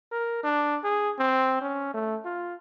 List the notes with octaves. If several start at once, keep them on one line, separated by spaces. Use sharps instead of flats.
A#4
D4
G#4
C4
C#4
A3
F4